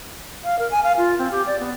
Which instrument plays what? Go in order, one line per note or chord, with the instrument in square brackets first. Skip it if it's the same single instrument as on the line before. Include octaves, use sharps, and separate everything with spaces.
[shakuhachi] F5
A#4
G#5
F5
F4
C4
G4
D5
B3